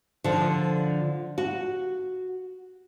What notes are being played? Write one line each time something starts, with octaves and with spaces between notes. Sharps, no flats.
D3 F3
F#4